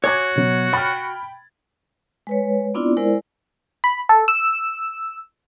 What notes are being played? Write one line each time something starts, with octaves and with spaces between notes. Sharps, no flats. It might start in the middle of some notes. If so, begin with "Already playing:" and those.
F#4 C#5 G#5 D6 G#6
B2 F#3
G5 B5 F6 A6
G#3 B4 C#5
B3 C4 D4 E4 F4 D5
G#3 E4 A#4 C5 D5
B5
A4
E6